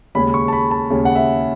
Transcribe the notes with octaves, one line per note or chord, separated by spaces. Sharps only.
D#2 C#3 G#3 C#4 B5
C#6
A5
B5
A5
D#2 C#3 G#3 C#4
F#5
E5